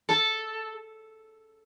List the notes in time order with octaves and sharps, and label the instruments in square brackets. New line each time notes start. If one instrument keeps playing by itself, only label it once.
[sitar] A4